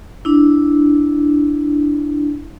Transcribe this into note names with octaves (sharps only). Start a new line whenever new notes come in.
D4 E4